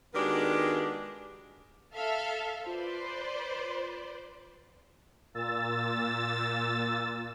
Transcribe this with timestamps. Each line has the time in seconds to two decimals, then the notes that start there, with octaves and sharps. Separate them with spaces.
0.14 D#3 G#3 B3 D4 F#4 G4
1.94 A4 E5 F5
2.66 F4 B4 C5 D5
5.34 A#2 E6 A6